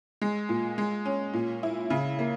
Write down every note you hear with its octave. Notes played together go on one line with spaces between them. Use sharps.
G#3
A#2
G#3
C#4
A#2
E4
C#3
A#3